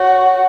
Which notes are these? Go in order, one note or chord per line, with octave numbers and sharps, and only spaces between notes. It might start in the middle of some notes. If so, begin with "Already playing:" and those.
Already playing: F#4 C#5